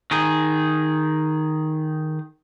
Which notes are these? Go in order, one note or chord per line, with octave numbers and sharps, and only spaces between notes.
D#3 G#4